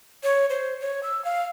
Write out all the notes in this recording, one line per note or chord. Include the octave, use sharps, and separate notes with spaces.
C#5
C5
C#5
E6
F5